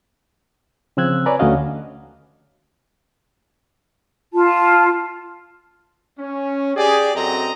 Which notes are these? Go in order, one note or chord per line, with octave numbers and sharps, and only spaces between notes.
C#3 F3 C4 E6 F#6 G#6
B4 C#5 D5 G#5 A#5
D2 A3 C#4 F#4 D#5 F5
F4 A5
C#4
G4 G#4 D5
F#2 C4 F#4 A4 D#5 A#5